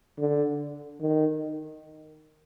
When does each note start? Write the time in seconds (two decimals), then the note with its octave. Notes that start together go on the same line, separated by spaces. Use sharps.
0.19 D3
1.01 D#3